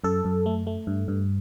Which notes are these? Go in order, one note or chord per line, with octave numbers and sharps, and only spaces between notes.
F#2 A4
F#2
A3
A3
G2
G2